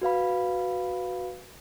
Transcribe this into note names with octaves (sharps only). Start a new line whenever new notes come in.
F#4 B4 F5 B5